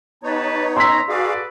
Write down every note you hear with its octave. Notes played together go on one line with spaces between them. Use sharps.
B3 D#4 G4 B4 C#5 A5
A#5 C6 E6 B6
F#4 G#4 A4 B4 D5 F5